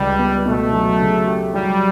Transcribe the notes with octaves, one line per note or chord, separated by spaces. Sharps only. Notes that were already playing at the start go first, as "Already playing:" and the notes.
Already playing: C#2 G3
B3
B2 A3
F#3
C#3
G4
F#3 G3